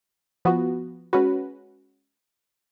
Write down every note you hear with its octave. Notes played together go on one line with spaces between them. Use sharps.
F3 B3 F#4
G#3 C#4 F#4 B4